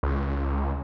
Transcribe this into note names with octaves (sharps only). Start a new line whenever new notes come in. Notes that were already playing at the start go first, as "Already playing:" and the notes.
C#2